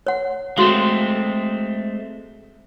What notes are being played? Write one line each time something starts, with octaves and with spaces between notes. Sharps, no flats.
C#5 F#5
G#3 A3 C4 F#4 F5